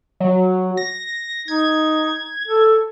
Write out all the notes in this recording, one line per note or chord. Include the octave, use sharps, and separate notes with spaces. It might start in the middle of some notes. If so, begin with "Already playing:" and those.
F#3
A#6
D#4 G#6
A4